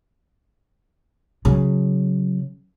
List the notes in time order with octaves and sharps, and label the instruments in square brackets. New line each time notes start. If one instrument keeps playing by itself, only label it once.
[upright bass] C#3 F#3